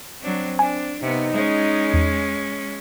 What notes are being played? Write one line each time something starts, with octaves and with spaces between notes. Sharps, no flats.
F#3 C4 D4
D4 G#5
C3 B3 D#4
G#3 C#4
E2